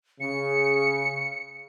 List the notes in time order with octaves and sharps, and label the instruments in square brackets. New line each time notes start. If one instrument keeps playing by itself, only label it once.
[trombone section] C#3 [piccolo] C#7